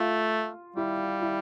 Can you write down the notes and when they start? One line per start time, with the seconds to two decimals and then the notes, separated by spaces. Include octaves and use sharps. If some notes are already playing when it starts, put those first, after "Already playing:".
Already playing: A3 F4
0.76 G3 E4
1.22 E4